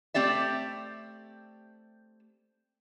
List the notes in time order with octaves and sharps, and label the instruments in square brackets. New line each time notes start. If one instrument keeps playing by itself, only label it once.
[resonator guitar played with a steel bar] A3 C4 G4 D5 E5